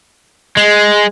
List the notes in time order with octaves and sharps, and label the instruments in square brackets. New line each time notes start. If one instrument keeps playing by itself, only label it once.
[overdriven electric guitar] G#3